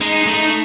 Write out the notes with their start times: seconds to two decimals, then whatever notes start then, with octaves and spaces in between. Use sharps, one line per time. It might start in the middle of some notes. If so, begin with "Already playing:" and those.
0.01 G#3 D#4
0.27 A3 D#4